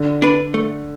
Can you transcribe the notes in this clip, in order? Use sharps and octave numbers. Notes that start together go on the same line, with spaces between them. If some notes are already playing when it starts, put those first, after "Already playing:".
Already playing: D3
D4 B4
A3